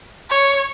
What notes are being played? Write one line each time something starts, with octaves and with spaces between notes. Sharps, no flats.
C#5